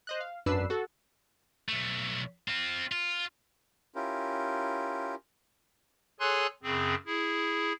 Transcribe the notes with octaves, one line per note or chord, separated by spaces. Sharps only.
C5 D#5 F#6
F5
G#1 F#2 D4 B4 E6 C7
F#4 A4
B1 A3
C4 F4
F4
C#4 E4 F4 G4 A#4
G#4 A4 C#5 G#5 C6 F#6
F#2 C#3 C4 G#4
E4 G#4